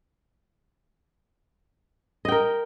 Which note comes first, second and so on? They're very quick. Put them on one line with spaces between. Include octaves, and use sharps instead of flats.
D#5 G5 A#4